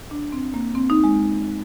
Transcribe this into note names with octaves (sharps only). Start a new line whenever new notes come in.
D4
C4
A#3
C4
D#4
G#3